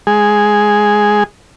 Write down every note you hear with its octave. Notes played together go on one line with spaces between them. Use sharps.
G#3 G#4